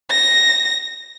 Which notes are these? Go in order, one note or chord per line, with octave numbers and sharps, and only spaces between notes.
A#6